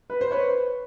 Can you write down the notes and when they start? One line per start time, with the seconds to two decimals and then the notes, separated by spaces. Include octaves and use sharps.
0.10 B4
0.21 C5
0.31 B4 C#5